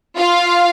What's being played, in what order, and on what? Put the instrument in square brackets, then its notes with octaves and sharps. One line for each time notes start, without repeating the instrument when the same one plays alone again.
[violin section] F4 F5